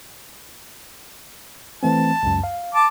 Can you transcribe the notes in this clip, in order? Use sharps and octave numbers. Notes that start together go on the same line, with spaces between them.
E3 A3 C4 A5
C#2 F#2
F5
A5 D6